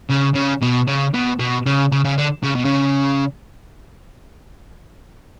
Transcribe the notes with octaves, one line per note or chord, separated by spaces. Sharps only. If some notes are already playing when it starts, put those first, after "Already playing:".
C#3
C#3
B2
C#3
B2
B2
C#3
C#3
C#3
D3
C#3
B2
C#3